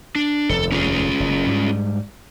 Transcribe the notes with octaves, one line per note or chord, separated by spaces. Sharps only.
D4
F1 D#2 A4
C#4 F4 G#4
F#1 F#2
G#2 G3